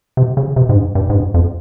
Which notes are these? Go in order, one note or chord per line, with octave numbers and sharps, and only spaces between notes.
C3
C#3
C3
G#2
G2
G2
G#2
G2
F2